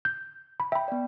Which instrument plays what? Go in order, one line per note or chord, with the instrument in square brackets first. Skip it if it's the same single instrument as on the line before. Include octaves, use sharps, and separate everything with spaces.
[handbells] G6
B5
[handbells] E5 B5 [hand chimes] G5
[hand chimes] B3 D5